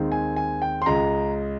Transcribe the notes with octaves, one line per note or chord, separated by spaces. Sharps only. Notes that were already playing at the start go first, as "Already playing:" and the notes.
Already playing: D#2 D#3 G#3 C4
G#5
G#5
G5
C6
C#2 C#3 G#3 A#5